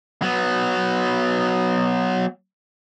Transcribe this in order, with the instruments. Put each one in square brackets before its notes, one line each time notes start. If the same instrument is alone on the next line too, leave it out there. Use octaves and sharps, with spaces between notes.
[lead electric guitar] F#3 B3